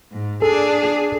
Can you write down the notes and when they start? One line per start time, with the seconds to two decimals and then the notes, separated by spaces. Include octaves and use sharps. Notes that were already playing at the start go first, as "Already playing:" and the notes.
0.12 G#2
0.42 D4 G#4 A4